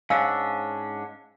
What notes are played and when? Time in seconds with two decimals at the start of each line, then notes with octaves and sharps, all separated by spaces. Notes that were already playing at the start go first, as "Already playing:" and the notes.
0.10 G#2 C#4 D4 F5 G#5 E6